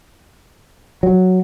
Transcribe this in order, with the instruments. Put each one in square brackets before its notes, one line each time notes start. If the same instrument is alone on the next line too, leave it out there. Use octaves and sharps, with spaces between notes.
[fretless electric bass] F#3